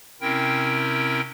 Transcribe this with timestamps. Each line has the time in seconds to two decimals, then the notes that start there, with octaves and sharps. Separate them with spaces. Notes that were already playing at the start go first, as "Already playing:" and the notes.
0.21 C3 C4 C#4 E4 A#4 G5